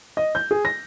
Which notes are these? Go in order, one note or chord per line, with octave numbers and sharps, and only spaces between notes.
D#5
G6
G#4
A#6